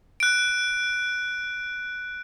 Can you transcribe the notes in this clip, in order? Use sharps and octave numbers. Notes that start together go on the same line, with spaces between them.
F#6 D7